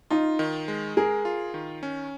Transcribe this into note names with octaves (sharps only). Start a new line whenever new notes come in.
D#4 F4
D#3
G#3
G#4 A#4
F4
D#3
C#4